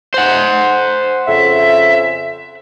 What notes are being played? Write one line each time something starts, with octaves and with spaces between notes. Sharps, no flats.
C5 F#5
F2 C#3 E5